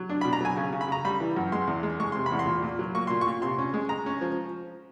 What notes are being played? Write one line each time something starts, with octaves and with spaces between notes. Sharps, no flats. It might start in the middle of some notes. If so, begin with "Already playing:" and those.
Already playing: F#3
D4
B2 B5
A#5
F#3 G#5
C#3
C#3
B5
C#3 A#5
G3 B5
E3
F#2
G#3 C6
E2
G#3
G#3 C#6
C3 C6
B5
E2
C6
A#2
A#2
F#3
A#3 C#6
A#2 C6
C#6
A#2
C3 C6
C#4
G#3
G#3 A#5
C#4
F3